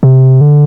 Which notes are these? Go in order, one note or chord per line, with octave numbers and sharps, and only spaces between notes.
C3
D3